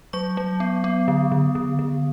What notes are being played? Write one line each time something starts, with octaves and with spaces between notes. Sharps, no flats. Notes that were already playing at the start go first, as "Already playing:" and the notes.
F#3 C#6
F#3
B3
B3
D3
D3
D3
D3